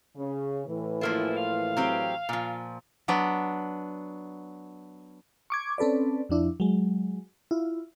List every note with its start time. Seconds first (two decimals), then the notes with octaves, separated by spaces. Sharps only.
0.17 C#3
0.67 A2 E3
1.01 F#2 F3 A#3 E4 F4
1.37 F5
1.77 F#3 C4 G4
2.29 A#2 F3
3.08 F#3 B3 D4
5.50 C#6 D6 G#6
5.78 C4 C#4 A4 B4 D5
6.29 F2 F3 D4 E4
6.60 F#3 G#3
7.51 E4 F4